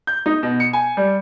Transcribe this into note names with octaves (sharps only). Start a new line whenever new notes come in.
G6
D#4
B2
C#7
G#5
G3